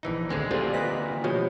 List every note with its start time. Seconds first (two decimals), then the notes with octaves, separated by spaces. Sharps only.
0.03 A#1 E3 D#4
0.30 D2 D3 G#3 C4
0.51 D2 A#2 C4 D4 F4 G4 A4
0.73 B4 D#5 F#6 A#6 B6
1.24 B2 F3 G#3 F4 G4 C#5